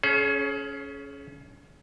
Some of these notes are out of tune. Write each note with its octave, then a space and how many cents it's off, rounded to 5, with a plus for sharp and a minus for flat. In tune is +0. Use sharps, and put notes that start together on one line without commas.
C#4 +10 G#4 +40 C#5 -35